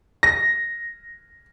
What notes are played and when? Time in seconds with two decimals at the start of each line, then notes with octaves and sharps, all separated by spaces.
0.23 A#6